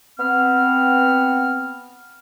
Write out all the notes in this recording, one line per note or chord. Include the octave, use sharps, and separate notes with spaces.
B3 C4 F6